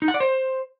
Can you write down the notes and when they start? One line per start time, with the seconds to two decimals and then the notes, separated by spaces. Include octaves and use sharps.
0.02 D#4
0.08 F#5
0.14 D5
0.20 C5